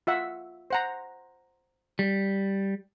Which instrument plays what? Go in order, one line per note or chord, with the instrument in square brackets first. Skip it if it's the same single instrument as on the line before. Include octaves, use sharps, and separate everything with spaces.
[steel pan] F4 E5 F#5
C5 F#5 A#5
[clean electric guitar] G3